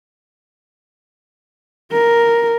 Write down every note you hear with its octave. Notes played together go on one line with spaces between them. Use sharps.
A#4